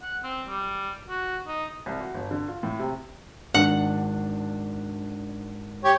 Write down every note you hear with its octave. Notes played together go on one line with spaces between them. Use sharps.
F#5
C4
G3
F#4
D#4
C2
F#4
G1
D3
F4
A2
C3
G#1 D4 F#5 F#7
G4 C#5